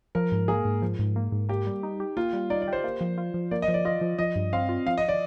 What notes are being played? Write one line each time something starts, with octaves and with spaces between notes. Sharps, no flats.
F3 A#4
G#2
A#3 G#4
G#2
F3
G#2
A#3
G#2
A#3 G4
G3
D#4
G4
A#3 F4
G3
D#4 D5
D5
G4 C5
A#3
F3
F4
F3
A#3 D5
D#5
F3
D5
F4 D#5
F3
F3 D#5
G2
C4 F5
F4
F3 F5
D#5
D5